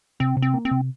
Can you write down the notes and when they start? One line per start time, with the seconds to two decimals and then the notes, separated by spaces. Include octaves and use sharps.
0.20 C3 C4
0.37 C3
0.42 C4
0.54 A#3
0.65 C4
0.71 C3